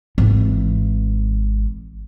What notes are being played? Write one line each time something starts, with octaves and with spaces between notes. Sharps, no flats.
G#1 E3